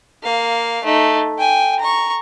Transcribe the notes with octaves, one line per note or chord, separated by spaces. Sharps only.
A#3 F5
A3 D#4
G5 G#5
A#5 C#6